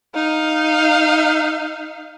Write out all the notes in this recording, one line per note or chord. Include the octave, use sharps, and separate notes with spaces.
D#4 F5